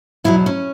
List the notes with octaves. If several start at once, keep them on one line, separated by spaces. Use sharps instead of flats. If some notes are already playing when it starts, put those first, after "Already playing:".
E2 B2 F#3 E4
C#4